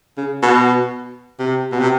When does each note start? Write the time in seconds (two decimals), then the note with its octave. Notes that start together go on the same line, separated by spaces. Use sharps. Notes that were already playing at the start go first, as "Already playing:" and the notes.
0.18 C#3
0.43 B2
1.39 C3
1.72 B2
1.80 C3